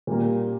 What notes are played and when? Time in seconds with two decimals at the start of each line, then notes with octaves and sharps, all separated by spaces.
0.07 A#2 G3 A#3